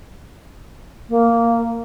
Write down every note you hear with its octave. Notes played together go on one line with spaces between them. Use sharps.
A#3